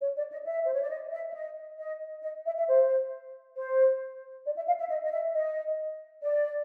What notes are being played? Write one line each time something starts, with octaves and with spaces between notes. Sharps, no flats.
C#5
D5
D#5
E5
C5
C#5
D5
D#5
E5
E5
D#5
D#5
D#5
E5
E5
C5
C5
D5
E5
F5
E5
D#5
D#5
E5
D#5
D5